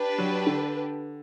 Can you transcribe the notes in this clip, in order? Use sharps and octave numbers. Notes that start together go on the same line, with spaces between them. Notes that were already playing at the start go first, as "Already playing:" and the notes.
Already playing: D4 G4 B4
F#3
D3